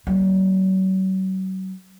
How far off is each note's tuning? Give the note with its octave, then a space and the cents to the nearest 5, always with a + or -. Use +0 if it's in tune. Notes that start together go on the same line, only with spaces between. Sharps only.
F#3 +40 A#3 +0